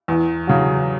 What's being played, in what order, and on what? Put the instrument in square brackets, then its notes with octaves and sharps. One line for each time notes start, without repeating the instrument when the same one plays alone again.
[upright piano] E2
C#3 F#3